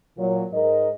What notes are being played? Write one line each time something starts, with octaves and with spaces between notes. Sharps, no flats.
A#2 F#3
G#2 A#4 D#5